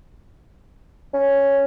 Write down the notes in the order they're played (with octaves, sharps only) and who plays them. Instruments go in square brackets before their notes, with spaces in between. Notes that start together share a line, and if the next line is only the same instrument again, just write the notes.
[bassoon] C#4